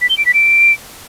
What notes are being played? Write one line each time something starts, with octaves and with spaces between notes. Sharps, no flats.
B6
G7
D7
B6
D7